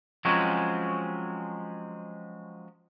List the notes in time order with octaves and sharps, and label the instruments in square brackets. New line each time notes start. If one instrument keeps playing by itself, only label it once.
[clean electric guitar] F3 F#3 G#3 C4 C#4 F#4